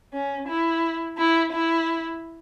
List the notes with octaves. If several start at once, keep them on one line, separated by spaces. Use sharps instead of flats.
C#4
E4
E4
E4